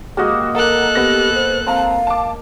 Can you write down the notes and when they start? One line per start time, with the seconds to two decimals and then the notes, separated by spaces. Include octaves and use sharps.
0.17 G#3 A#3 F#4 G4 D#5
0.55 A4 A#4 F#5 A#5 F#6
0.95 B3 G4 A#6
1.35 C5
1.67 C4 F5 A5 A#5
2.07 A5 D6